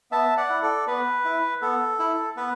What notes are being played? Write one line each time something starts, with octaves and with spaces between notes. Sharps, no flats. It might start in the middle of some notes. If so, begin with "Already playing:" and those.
B3 E5 A5
D5 F#5
E4
A4 D5
B3 B4
E4
B3 A4
E4
B3 B4